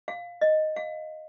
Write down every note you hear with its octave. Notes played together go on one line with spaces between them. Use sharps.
F5
D#5
F5